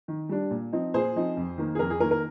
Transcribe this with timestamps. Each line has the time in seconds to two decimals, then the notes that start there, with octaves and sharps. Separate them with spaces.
0.08 D#3
0.29 G3 D4
0.51 A#2
0.73 F3 C4 D#4
0.94 A#2 G#4 C5
1.16 F3 C4 D#4
1.37 F2
1.58 D#3 A#3
1.75 G#4
1.79 F2 A#4
1.90 G#4
2.00 D#3 A#3 A#4
2.11 A#4